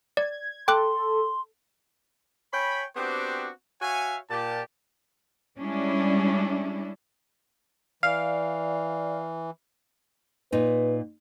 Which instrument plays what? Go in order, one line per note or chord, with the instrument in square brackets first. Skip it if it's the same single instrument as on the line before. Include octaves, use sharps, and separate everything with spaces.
[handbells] D5 [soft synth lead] G#6
[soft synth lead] A4 [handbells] G5 D6 F#6 [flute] C6
[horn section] C#5 G5 G#5 B5
B3 C4 D4 F#4 G4 C5
F#4 C#5 E5 F5 G#5
A#2 G4 A5
[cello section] G3 G#3 C#4 D4 E4
[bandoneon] E3 [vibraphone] D5 [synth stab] F5
[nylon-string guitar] A#2 D#4 [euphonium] B4